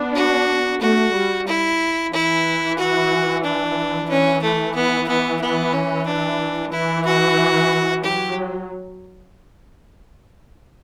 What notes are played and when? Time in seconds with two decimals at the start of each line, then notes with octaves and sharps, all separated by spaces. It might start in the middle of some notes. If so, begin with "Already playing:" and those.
Already playing: B3 D4
0.15 F#4
0.81 A3 F#4
1.14 G3
1.47 E4
2.13 E3 E4
2.78 F#4
3.44 D4
4.09 E3 C#4
4.43 A3
4.75 B3
5.08 B3
5.41 B3
5.73 C#4
6.06 D4
6.72 E3 E4
7.05 F#4
8.03 F#3 G4